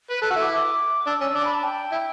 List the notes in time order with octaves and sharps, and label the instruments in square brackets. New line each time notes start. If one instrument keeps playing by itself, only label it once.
[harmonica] B4
[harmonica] A4 [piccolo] F#6
[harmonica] F#4 [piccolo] E6
[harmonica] E4 [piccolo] D6
[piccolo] D6
[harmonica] D4 [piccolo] E6
[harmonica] C#4 [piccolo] E6
[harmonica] D4 [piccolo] D6
[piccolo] B5
A5
G5
[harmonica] E4